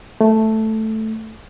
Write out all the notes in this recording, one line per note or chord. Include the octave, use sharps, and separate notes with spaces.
A3